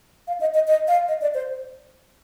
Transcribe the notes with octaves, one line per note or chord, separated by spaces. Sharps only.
F5
D#5
D#5
D#5
F5
D#5
D5
C5